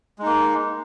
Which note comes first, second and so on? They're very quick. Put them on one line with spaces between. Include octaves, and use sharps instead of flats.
G#3 D#4 A#3